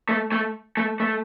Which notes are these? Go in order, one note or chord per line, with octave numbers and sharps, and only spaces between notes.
A3
A3
A3
A3